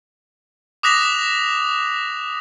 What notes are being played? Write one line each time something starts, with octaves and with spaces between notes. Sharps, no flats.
D6 D#6 F#6 A#6 B6 F7